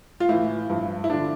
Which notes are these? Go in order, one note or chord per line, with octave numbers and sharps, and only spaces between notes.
F4
A2 E3 E4
G2 F3
E4
D3 F3 D4